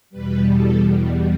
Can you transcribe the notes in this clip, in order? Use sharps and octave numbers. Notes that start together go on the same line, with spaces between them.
E2 B2 G3 B4
A4